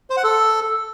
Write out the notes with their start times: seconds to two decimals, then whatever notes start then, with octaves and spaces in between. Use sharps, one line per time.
0.10 C5
0.17 F#5
0.24 A4